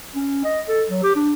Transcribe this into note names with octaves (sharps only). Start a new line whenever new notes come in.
C#4
D#5
A4
F#3
G4
D4